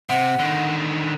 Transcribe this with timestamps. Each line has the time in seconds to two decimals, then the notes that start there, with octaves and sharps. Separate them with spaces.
0.09 C3 F#5
0.39 D3 D#3